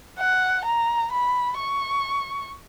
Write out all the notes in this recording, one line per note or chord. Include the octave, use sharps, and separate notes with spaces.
F#5
A#5
B5
C#6